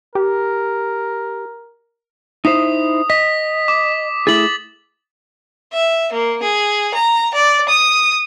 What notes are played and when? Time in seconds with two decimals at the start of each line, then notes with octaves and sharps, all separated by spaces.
0.15 G4 A#4
2.45 D#4 E4 C5 D#6
3.10 D#5 B6
3.68 D6
4.27 A3 E4 G#4 A6 F#7
5.73 E5
6.12 A#3
6.42 G#4
6.94 A#5
7.34 D5
7.68 D#6